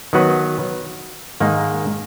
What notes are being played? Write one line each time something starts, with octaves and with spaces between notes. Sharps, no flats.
D#3 F#3 B3 F#4 B4
G#2 D#3 A#3 D#4